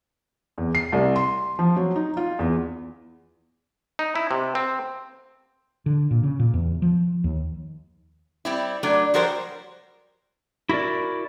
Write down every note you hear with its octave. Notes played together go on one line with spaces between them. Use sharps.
E2
C7
C2
C6
F3
F#3
D#4
F4
E2
D#4
E4
C3
C4
D3
A#2
C#3
A#2
E2
F3
D#2
G3 C4 E4
F#3 A3 D4
F3 G3 F#4 A#4 C5 C#5
E4 F#4 A4 A#4 D5